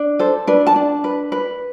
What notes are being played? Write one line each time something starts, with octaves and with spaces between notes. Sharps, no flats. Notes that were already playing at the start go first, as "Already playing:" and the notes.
Already playing: D4
A4 C5
D4 B4
A5
D4
B4
B4